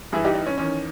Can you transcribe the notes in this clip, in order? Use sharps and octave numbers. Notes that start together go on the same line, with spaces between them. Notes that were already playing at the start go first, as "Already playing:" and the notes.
G2 E3 E4 G#4
D#4 G4
D#4
C#4
E2 D#3 C#4